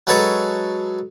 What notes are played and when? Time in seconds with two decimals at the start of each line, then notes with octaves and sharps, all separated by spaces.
0.07 F#3 G#3 A4 B4 C#5 A#5